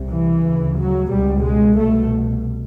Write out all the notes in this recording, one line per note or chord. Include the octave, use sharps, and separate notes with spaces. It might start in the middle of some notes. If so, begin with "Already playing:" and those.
Already playing: C2 C3
E3
D2 C#3
F#3
C#2 B2 G3
G#3
C2 B2 A3